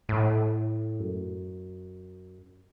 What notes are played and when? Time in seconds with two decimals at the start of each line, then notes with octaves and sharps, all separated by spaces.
0.09 A2
1.00 F#2